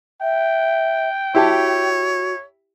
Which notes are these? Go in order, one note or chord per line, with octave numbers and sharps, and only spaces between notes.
E5 G5
E4 F#4 G4 C#5 A5